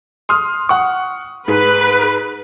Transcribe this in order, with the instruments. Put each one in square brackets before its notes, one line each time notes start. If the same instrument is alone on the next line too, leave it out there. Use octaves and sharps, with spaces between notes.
[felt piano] C6 D#6 F6
F#5 C#6
[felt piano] G#2 [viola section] B4